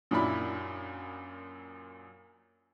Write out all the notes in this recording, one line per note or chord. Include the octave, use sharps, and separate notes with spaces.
F#2 A#2 D4 E4 B5